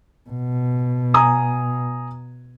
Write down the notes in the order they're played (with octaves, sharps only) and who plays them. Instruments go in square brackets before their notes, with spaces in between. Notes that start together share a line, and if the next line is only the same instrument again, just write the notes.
[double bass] B2
[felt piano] G#5 A#5 D#6